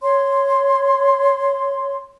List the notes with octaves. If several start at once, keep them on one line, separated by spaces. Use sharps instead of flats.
C#5 C6